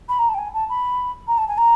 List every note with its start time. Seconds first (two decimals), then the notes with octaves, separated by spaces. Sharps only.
0.08 B5
0.19 A#5
0.29 A5
0.34 G5
0.38 G#5
0.54 A5
0.69 B5
1.27 A#5
1.38 A5
1.47 G#5
1.57 A#5